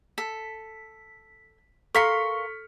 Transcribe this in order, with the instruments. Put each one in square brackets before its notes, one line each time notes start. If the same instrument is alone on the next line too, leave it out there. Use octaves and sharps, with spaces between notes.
[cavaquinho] A4 [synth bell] B6
[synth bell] A4 [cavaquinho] A#4 F5 C6 [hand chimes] C#6 [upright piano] F6 B6 C#7